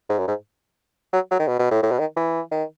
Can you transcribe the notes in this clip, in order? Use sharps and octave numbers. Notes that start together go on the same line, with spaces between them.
G#2
F#2
G#2
F#3
F#3
D#3
B2
B2
A2
A2
B2
D#3
E3
D#3